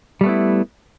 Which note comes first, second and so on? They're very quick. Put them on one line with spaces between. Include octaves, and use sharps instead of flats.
G3 A3 B3 E4